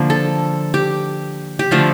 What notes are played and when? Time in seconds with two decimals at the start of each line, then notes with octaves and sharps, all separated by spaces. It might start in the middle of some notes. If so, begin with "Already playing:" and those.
Already playing: D3 F3 A#3
0.10 A4
0.74 G4
1.59 G4
1.71 D3 F3 A3 F4